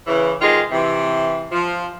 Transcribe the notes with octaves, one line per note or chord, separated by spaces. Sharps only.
C#3 E3
C3 D#3 G#3 F4
C3 E3
F3